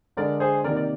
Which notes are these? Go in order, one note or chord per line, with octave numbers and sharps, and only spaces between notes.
D3 G#3 D4 A#4 D5
G#4 C5
C3 D#3 A#3 A#4 D5
D5